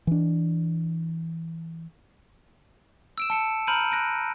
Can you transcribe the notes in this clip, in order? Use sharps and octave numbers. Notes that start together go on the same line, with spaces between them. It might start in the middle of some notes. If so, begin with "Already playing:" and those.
E3 D4
E6 D7 E7
A5 C#7 E7
A#5 B5 F6 G6 D7 D#7
F#6 A#6 D7 D#7